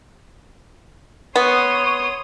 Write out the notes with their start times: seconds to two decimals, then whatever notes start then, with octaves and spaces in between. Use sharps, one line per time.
1.36 B3 C#5 C6 D#6